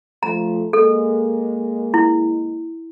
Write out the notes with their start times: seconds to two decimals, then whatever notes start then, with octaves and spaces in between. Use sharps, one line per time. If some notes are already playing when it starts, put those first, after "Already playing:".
0.23 F3 A3 A#5
0.73 G#3 A#3 A4
1.94 E4